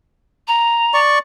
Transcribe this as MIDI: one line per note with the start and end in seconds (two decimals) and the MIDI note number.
0.47 0.97 82
0.94 1.19 74
0.94 1.19 85